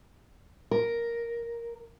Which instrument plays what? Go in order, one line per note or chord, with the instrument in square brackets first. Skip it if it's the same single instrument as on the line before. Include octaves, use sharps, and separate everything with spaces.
[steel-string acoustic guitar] A#4